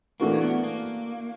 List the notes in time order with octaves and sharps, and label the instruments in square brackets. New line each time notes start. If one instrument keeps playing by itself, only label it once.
[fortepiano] E3 A3 D4 F#4 A#4 [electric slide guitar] A#3
[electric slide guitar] B3
A#3